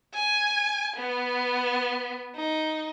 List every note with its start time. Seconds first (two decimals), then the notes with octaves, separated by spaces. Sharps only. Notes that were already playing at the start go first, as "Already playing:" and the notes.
0.14 G#5
0.96 B3
2.36 D#4